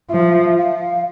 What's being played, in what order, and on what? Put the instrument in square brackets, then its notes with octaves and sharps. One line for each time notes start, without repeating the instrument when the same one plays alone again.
[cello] F3 [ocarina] E5
[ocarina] F5